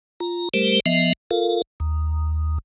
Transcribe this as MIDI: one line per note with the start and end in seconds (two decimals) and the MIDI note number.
0.20 0.49 65
0.20 0.49 82
0.54 0.80 55
0.54 0.80 57
0.54 0.80 67
0.54 0.80 70
0.54 0.80 72
0.86 1.13 53
0.86 1.13 59
0.86 1.13 75
0.86 1.13 76
1.31 1.62 65
1.31 1.62 69
1.31 1.62 70
1.31 1.62 77
1.80 2.58 39